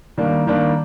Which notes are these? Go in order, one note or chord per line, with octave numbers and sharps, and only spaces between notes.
D#3 G3 A#3 D4
D#3 G3 A#3 D4